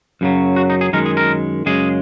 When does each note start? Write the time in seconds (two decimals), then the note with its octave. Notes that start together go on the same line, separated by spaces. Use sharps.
0.21 F#2 C#3 F#3
0.56 F#4
0.70 D#4
0.81 G#4
0.93 F#2 D#3 G#3 A#4
1.06 G#4
1.17 A#4
1.66 F#2 C#3 G#3 G#4